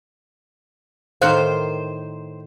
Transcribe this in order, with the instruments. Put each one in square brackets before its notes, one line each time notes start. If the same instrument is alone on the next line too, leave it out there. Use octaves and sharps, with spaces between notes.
[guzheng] A2 D#3 A#4 [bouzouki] C5 [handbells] F5 F#6 C#7